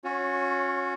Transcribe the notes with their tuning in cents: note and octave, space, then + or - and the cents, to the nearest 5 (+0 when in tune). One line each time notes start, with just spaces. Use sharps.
C#4 -15 F#4 -35 C#5 +0